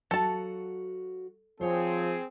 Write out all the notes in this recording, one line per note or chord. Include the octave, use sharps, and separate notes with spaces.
F#3 F#4 A4 F5 A5
F3 C4 G#4 C5 C#5